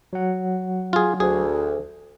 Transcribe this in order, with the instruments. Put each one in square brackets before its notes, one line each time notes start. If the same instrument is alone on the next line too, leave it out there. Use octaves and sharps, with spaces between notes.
[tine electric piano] F#3 F#5
[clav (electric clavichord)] F4 G#4
[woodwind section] D2 [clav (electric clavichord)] G#4